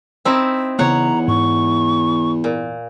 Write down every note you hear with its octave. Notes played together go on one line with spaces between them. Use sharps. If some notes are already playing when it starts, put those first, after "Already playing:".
C4 D#4 E4
E2 C#3 B3 C#5 F#5 A#5
G#2 C#6
A#2